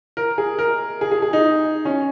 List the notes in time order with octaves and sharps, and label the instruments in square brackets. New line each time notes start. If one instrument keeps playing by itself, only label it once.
[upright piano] A#4
G#4
A#4
G#4
G#4
G#4
D#4
C#4